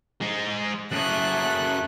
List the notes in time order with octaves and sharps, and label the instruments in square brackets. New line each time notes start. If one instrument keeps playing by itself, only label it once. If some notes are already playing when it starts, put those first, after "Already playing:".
[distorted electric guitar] G#3 D#4
[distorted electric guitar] F#2 G#4 [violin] A3 F#6